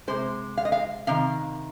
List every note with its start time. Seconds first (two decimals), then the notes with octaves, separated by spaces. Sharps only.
0.08 C3 G#3 C5
0.57 F5
0.65 D#5
0.72 F5
1.07 C3 D#3 F5